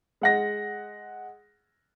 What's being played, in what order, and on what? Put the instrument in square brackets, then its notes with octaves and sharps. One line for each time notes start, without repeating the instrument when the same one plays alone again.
[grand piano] G#3 F#5 A#6